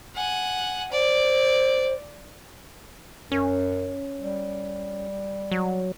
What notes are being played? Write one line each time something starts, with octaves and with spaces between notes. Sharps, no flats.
F#5 G#5
C5 D5
F#2 C#4
G3
F#3